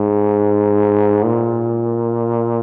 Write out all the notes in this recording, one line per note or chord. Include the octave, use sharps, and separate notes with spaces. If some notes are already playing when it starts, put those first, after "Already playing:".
Already playing: G#2
A#2